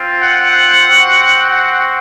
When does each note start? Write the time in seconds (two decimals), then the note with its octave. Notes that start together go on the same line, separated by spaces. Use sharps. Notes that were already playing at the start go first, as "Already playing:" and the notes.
Already playing: C4 F4
0.22 F#5
0.86 C4 F#4
1.49 F#5